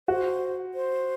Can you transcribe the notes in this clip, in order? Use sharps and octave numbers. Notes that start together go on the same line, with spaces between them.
F#4 C5
C5